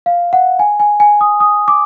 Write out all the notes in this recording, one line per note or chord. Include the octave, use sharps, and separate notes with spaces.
F5
F#5
G#5
G#5
G#5
D#6
D#6
D6